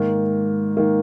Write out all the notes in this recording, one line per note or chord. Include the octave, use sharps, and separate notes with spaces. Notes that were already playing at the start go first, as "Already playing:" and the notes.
Already playing: G#2 D#3 A#3
D#3 A#3